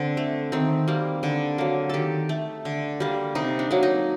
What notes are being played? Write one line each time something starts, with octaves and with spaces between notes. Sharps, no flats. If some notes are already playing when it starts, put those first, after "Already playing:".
Already playing: D3 C4
A3
D#3 C4
G3 A#3
D3
F#3 A#3
D#3 G4 A4
A3
D3
G3 A#3
C3 D#4
D4
F#3 A#3
D#4